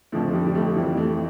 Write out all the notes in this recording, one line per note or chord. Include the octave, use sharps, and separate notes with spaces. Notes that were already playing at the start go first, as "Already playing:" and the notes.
F2 D3 F3 A3
G3
G3
A3
F2 E3 G3
A3